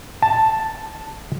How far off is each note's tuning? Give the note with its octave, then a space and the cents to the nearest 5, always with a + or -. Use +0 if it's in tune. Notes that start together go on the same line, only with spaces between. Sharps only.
A5 +5